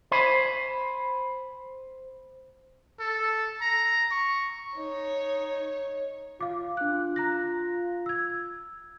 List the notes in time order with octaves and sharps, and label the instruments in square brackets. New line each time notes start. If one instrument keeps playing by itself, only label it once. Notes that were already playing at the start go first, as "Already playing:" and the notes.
[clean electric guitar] C5 G#5 B5
[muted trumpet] A4
A#5
C#6
[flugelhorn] D#4 [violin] C#5
[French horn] F4 [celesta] F5 D6
[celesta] D4 F#6
A#5 F#6 A#6
E6 G#6